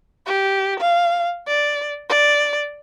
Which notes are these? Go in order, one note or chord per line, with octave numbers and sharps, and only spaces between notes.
G4
F5
D5
D5